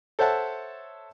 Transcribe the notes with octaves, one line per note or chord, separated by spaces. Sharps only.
A4 C5 C#5 E5 F#5 A5